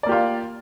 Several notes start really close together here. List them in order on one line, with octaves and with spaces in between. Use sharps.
D5 A#3 G4 F4